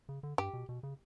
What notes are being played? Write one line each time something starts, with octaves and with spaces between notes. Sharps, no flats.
C#3
D3
G2 G4
B2
B2
C#3